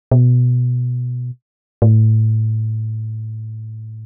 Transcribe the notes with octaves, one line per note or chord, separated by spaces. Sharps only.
B2
A2